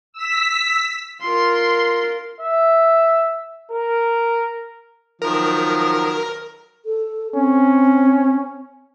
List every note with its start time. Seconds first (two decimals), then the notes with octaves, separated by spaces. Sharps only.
0.13 E6 B6
1.22 F4 A#4 C6
2.40 E5
3.72 A#4
5.22 D#3 F3 F#3 A#4
6.86 A4
7.35 C4 C#4